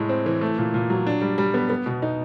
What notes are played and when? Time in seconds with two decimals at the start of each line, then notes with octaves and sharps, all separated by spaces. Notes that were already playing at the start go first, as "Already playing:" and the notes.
Already playing: A2 G#3
0.09 C4
0.26 E3
0.41 A3
0.58 A#2
0.74 A#2
0.90 F#3
1.07 D4
1.21 G3
1.38 G3
1.54 B3
1.70 B3
1.86 B2
2.02 D#4